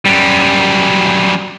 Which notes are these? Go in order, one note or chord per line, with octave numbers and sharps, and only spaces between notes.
F#2 G3